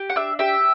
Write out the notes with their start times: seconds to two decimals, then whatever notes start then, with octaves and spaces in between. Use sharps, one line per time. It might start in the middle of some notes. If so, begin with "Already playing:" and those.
Already playing: G4
0.10 F#5
0.16 D4 E5
0.39 G4 E5